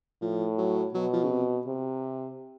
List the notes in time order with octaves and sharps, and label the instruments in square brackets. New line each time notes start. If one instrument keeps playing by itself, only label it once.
[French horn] A2 [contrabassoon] F3
[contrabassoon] F#3
[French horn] B2 [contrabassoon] F#3
[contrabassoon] F3
C#3
C3
[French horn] C3